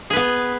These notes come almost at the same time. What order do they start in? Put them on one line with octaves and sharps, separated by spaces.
G#4 B4 B3